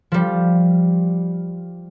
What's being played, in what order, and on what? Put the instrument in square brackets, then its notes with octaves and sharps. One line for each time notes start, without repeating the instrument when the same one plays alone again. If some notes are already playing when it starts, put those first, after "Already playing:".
[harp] F3 G3